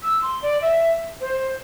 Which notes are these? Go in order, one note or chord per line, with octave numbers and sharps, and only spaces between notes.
E6
C6
D5
E5
C5